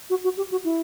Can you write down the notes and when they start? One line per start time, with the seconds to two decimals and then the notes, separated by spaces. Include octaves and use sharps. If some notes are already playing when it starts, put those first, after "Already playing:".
0.10 F#4
0.24 F#4
0.37 G4
0.51 F#4
0.64 E4